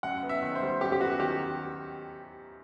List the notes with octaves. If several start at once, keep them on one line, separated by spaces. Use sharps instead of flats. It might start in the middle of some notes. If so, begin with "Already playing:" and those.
F#2 F#5
B3
E5
D#3
C5
G3
F#2 G4
G4
B3 F#4
D#3 G4